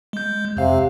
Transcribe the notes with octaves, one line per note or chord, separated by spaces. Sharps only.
G#3 G6
F2 C3 F5